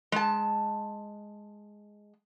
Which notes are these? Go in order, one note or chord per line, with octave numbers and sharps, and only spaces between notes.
G#3 A5